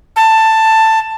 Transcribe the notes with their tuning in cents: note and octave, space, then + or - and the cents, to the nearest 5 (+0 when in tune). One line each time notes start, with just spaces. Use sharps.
A5 +10